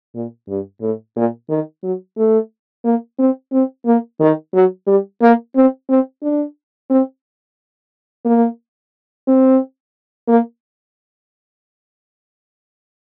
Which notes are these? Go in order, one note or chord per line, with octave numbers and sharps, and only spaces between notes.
A#2
G2
A2
A#2
D#3
F#3
A3
A#3
C4
C4
A#3
D#3
F#3
G3
A#3
C4
C4
D4
C4
A#3
C4
A#3